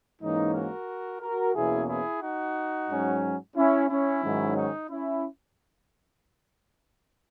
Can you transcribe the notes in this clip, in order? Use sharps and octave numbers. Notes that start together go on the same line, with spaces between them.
G#2 E3 A#3 C#4 D#4
F#4 A#4
F#4 A#4
E2 B2 A#3 C#4 E4 G#4
E4 G#4
D#4 F#4
G#2 F#3 C#4
C#4 E4
C#4 E4
G#2 D#3 F#3 C#4
D#4
C#4 E4